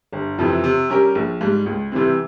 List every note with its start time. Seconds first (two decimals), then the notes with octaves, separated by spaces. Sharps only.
0.13 G1
0.39 F2 C3 E3
0.64 C3
0.90 G3 C#4 G4 A#4
1.15 A#1
1.41 G#2 G3
1.66 C#2
1.92 C3 E3 G3 C4